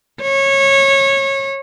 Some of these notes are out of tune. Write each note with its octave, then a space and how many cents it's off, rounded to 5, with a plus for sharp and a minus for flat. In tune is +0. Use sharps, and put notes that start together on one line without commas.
C#5 -20